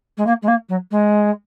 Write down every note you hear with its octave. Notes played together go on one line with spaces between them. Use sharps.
G#3
A#3
G#3
A#3
F#3
G#3